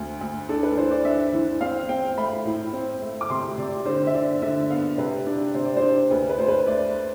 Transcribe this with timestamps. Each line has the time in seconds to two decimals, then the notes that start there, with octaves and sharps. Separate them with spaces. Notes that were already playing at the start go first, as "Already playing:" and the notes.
Already playing: D2 C4
0.21 D2
0.49 D4 A4
0.63 B4
0.77 E3 C5
0.91 D5
1.05 D4 E5
1.33 E3
1.61 C4 F5
1.89 C4 G5
2.17 A3 B5
2.45 A2
2.73 C4
3.02 A3
3.21 D6
3.30 C3 C6
3.58 C3 D5
3.85 D3 C5
4.07 E5
4.14 D3 D5
4.42 D3 E5
4.70 B3 F5
4.98 C3 B4
5.26 D4 D5
5.54 C3 C5
5.65 D5
5.77 C5
5.82 D4
6.11 D2 B4
6.29 B4
6.39 D2 C5
6.48 B4
6.67 A3 D5